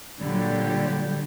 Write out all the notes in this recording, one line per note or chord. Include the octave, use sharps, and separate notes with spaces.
A#2 D3 F#3 G3 G4